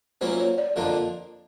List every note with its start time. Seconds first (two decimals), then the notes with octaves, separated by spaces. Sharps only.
0.21 A#2 F#3 A#3 C#4 E4 C5
0.40 C#5
0.58 D5
0.76 F2 D3 F3 A#3 D4 D#5